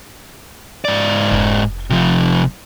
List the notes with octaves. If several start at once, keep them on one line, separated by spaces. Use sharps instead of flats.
G#2 D5
F1
C3 F3